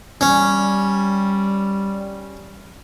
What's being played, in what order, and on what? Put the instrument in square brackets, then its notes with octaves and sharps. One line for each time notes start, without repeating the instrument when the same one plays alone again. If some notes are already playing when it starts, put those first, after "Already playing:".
[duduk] G3 [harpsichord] C#4